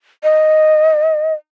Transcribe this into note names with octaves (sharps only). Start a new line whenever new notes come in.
D#5